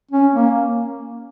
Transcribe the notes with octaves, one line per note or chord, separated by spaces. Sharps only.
C#4
A#3